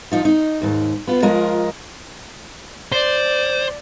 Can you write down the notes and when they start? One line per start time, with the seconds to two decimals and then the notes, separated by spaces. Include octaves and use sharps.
0.12 F3 D#4 F4
0.25 D#4
0.62 D#2 G#2
1.07 B3 F4
1.22 F3 G#3 F4 A#4 D#5
2.92 C5 D5